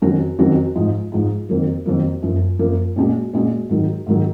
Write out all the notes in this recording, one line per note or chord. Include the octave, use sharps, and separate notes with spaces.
F2 D#3 F#3 C#4 F#4
F2 D#3 F#3 C#4 F#4
G#2 F3 G#3
G#2 F3 G#3
F2 D#3 F#3 A#3
F2 D#3 F#3 A#3
F#2 F3 A#3
F#2 F3 A#3
A#2 G#3 C#4 F#4
A#2 G#3 C#4 F#4
G#2 D#3 F#3
G#2 D#3 F#3